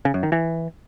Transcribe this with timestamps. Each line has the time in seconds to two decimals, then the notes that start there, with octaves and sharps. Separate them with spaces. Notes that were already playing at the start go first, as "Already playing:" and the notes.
0.05 C#3
0.14 F#2
0.23 D#3
0.32 E3